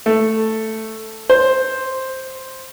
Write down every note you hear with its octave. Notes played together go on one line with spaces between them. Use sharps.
A3
C5